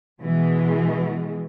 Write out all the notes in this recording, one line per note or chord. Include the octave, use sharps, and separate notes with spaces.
B2 E3 G#3